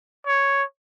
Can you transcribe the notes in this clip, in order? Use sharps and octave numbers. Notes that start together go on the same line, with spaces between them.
C#5